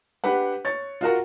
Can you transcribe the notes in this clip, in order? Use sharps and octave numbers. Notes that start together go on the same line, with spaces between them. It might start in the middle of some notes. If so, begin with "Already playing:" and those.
D4 G4 B4 F#5
C#5 A6
F4 F#4 A#4 F#5